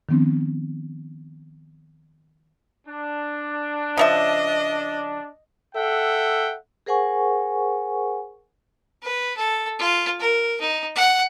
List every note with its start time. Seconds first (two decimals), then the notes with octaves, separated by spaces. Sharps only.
0.09 D#3 F3 B3 C4 D4
2.88 D4
3.97 C#3 F3 D#5 E5
5.75 A4 E5 F#5 G5
6.86 G#4 A#4 C5 F#5 G#5 C#6
9.03 B4
9.37 A4
9.79 F4
10.20 A#4
10.61 D#4
10.96 F#5